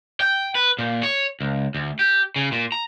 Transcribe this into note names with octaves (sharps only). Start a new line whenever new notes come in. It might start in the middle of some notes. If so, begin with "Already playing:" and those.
G5
B4
A#2
C#5
C#2
D2
G4
C#3
A#2
A#5